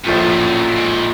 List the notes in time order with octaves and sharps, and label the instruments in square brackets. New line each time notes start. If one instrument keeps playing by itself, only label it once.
[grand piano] A#1 A2 F3 [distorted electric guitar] F#2
[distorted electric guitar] G2
F#2
G#2